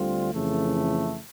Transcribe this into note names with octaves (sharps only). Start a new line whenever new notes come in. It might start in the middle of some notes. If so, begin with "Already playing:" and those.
Already playing: D2 D3 G3 C4 F4
F2 C#3 E3 A3